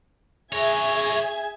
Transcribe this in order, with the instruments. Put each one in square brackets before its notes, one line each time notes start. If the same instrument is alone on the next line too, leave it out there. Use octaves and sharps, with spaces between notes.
[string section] G#4 E5 G#6 [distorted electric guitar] A#4 C#5